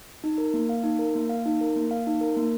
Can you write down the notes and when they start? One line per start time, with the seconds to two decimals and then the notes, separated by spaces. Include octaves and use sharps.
0.24 D#4
0.38 A#4
0.54 A#3
0.69 F5
0.84 D#4
0.99 A#4
1.15 A#3
1.29 F5
1.46 D#4
1.61 A#4
1.76 A#3
1.91 F5
2.07 D#4
2.21 A#4
2.37 A#3